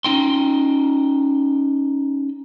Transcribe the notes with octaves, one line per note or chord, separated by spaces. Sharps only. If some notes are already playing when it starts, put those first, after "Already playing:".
C#4 D#4 G5 C6